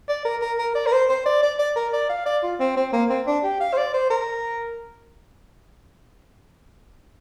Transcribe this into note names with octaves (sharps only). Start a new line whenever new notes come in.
D5
A#4
A#4
A#4
D5
A#4
C5
C5
D5
D5
D5
A#4
D5
F5
D5
F4
C4
C4
A#3
C4
D4
G4
F5
C5
D5
C5
A#4